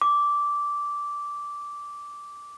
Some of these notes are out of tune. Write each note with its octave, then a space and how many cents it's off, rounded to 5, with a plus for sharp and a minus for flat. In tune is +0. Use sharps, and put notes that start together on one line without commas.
D6 -10